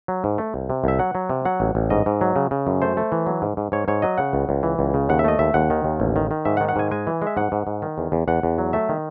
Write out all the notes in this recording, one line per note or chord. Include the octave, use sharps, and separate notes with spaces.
F#3
G#2
A3
C2
C3
C2 E5
F#3 F#5
F#3
C3
F#3 F#5
A1
A1
G#2 D#5
G#2
F#3
C#3
C#3
F#2
A3 C5
A3
E3
F#3
G#2
G#2
G#2 C#5
G#2 C#5
F#3 D#5
C#3 F#5
C#2
C#2
E3
C#2
C#3
D#2 F#5
E5
A3 D#5
D#2 E5
D#2 F#5
D#3
D#2
A1
D#3
D#3
G#2 E5
F#5
D#3
F#5
G#2 G#5
G#3 G#5
E3
G#3
E5
G#2 F#5
G#2
G#2
D#3
E2
E2
E2 F#5
E2
F#3
A3 E5
D#3